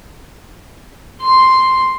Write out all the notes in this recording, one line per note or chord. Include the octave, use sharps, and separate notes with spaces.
C6